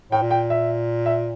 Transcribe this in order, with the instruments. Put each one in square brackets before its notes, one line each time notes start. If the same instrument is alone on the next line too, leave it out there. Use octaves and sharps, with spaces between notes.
[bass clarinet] A2 [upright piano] G5
[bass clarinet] A#2
[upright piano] G5
E5
E5